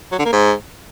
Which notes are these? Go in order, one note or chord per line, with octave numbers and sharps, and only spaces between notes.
F#3
D3
A#3
G#2